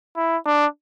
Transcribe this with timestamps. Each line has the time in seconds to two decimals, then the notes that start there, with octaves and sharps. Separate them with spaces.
0.17 E4
0.46 D4